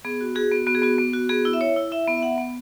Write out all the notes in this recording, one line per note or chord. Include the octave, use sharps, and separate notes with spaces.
B3 G#4
F#4
F#4 G#4
B3
B3 F#4
G#4
B3 F#4
B3
F#4
B3 G#4
E4
E5
E4 C#5
E4
E4 E5
B3
E5
B3 F#5
B3